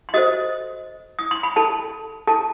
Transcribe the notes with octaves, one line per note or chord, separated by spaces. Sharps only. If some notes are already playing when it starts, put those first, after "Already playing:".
C6
F#4 A4 C5 D#5 D#6
D#6
C6
B5
A4 A5
A4 A5